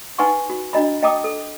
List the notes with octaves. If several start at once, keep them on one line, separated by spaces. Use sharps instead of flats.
D#4 B4 F#5 G#5 C6 C#6
F#4
D4 F#4 D#5 A#5 B5
D#5 G5 A5 A#5 D6 D#6
A4